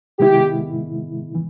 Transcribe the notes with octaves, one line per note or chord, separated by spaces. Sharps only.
C3 D#3 G#3 B3 E4 G4
E3